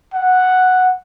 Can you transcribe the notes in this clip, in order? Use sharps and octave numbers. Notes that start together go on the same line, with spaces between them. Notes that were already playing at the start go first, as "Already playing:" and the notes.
F#5